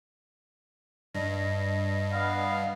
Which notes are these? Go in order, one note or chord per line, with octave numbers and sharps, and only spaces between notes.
G2 D#5
B3 F5